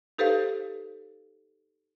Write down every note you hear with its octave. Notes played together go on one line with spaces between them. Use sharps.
D#4 G4 A4 B4 C5 F5